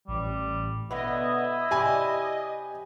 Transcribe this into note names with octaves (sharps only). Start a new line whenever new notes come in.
A1 G3
B2 D3 B3 E4 D#5
C3 G4 D5 G#5 B5